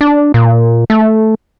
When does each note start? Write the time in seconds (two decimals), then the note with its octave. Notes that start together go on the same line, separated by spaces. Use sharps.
0.01 D4
0.34 A#2
0.90 A3